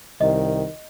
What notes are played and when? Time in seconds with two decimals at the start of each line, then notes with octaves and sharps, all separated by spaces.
0.21 C2 D#3 D#5